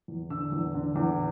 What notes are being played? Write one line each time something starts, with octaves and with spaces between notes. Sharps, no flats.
E2
D3 E6
E2
D3
E2